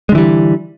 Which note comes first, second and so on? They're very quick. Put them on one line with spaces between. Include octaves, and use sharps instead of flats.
G#3 D3 E3 G3